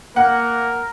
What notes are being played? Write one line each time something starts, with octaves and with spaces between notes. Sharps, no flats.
A#3 A#4 F#5